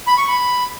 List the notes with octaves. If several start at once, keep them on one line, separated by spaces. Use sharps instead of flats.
B5
C#6
B5